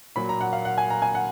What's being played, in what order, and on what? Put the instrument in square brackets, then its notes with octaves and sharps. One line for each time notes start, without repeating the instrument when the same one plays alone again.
[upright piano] A#2 F#3 A#3 B5
A#5
F#5
F5
F#5
G#5
A#5
G#5
F#5